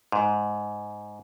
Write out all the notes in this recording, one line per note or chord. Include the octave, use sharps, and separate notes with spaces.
G#2